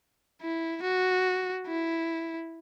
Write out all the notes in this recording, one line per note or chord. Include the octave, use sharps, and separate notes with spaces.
E4
F#4
E4